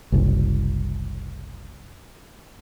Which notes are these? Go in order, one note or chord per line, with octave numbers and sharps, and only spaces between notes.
F#1 C2